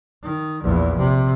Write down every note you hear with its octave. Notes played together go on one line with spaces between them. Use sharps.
D#3
A#1 E2
C3